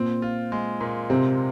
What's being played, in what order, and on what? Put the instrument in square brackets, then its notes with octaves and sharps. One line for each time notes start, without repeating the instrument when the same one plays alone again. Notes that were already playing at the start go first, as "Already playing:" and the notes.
Already playing: [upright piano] A#2 [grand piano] C4
[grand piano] F4
G#3
A#2
[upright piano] C3 [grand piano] C4